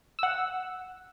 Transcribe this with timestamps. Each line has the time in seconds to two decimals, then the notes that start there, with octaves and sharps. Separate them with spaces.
0.19 F#5 E6